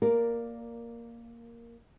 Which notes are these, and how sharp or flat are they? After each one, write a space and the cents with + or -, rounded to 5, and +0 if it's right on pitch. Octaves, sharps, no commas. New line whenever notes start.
A#3 +0 A#4 +0 D5 +0